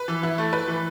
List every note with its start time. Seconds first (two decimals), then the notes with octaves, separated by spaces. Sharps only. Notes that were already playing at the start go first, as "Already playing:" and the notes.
Already playing: B4
0.08 E3
0.23 E4
0.38 A3
0.53 B4
0.68 E3